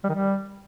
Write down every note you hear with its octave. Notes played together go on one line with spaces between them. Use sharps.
G3
D#3
G3